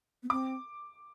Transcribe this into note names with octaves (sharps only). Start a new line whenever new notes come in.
B3
C4 D6